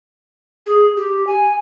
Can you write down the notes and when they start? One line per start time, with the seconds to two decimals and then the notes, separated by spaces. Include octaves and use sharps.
0.66 G#4
0.97 G4
1.27 G#5